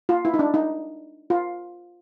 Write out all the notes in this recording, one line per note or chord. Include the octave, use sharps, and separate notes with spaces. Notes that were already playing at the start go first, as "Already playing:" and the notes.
F4
E4
D#4
D4
D#4
F4